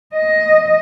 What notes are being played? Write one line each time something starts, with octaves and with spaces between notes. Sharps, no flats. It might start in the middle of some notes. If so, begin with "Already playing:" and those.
D#5